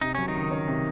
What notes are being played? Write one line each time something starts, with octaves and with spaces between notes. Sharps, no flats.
C3 D#4
F#3 C#4
D#3 D#4
C#2
C#4
C3